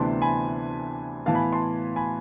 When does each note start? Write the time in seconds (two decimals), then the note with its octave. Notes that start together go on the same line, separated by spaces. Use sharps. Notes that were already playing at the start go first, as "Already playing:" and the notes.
Already playing: D2 C3 E3 B3 D4 A5 C6
0.22 G#5 B5
1.26 A2 E3 B3 F5 A5
1.35 G#5 B5
1.53 A5 C6
1.96 G#5 B5